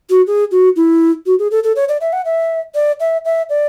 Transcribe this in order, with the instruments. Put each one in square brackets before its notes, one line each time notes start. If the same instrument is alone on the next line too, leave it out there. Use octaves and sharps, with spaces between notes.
[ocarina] F#4
G#4
F#4
E4
F#4
G#4
A4
A4
C#5
D5
E5
F#5
E5
D5
E5
E5
D5